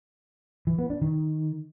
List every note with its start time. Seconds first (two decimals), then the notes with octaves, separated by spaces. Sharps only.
0.67 E3
0.79 B3
0.90 D4
1.02 D#3